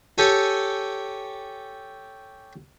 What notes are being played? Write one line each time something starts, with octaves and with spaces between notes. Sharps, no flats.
G4 A4 C#5 G#5